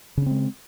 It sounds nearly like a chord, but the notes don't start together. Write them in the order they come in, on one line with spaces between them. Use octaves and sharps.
C#3 C#4 C4 G#3